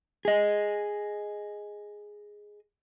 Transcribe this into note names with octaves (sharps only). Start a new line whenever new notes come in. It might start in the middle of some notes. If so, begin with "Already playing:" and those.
G#4 D#5